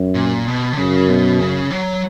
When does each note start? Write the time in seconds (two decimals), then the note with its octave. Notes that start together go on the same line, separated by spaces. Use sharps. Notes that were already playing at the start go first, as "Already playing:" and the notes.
Already playing: F#2
0.15 A#2
0.47 B2
0.72 D3
0.77 F#2 C#3
1.08 B2
1.40 C#3
1.71 F#3